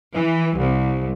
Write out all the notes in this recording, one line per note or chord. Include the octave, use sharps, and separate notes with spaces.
E3
C2